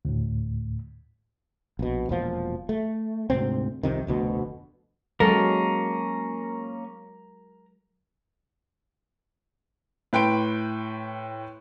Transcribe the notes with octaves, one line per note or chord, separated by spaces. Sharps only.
D2 A2
A#1 B2
E1 A#2 F3
A3
D2 G#2 C3 C4
C2 F2 C3 D#3
F1 D2 B2
F#3 G#3 A#3 C#4 A4 A#4
A2 B4 G5 C6 D7